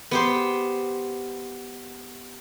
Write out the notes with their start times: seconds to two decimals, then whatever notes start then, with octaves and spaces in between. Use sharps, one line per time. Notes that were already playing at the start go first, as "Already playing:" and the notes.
0.11 B3 G4 C5